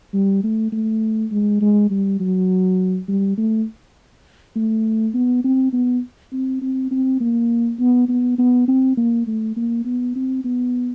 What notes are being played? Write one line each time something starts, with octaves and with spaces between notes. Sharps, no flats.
G3
A3
A3
G#3
G#3
G3
F#3
G3
A3
A3
B3
C4
B3
C4
C4
C4
A#3
B3
B3
B3
C4
A#3
A3
A#3
B3
C4
B3